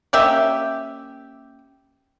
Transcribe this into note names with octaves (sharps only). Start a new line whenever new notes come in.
A#3 C#4 G4 E5